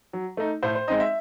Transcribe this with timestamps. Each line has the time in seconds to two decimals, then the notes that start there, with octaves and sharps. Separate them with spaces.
0.13 F#3
0.37 A3 D#4
0.63 A2 C5
0.75 C5
0.88 G#3 C4 D#4 D#5
1.00 E5